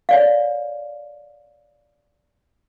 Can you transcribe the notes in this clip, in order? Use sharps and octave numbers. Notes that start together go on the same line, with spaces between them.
C#5 D5 F5